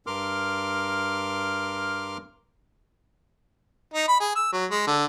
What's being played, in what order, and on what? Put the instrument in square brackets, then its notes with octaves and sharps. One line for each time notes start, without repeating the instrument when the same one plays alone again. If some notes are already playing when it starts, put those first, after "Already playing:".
[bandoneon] G2 A#4 C6 D6 F6
[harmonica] D#4
B5
G#4
E6
F#3
G#3
D3